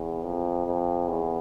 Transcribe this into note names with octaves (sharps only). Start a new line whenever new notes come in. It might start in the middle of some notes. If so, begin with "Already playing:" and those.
Already playing: E2
F2
F2
E2